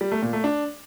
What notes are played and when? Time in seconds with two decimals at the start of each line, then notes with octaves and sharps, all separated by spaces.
0.01 G3
0.12 A3
0.22 A#2
0.33 A3
0.44 D4